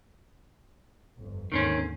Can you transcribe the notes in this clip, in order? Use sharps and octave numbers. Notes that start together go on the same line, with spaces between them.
G1 F2
D#2 G#2 D3 D#3 C4 C#4